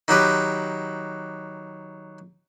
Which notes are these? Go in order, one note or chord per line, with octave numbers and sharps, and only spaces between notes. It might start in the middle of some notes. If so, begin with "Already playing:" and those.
D#3 F#3 G4 B4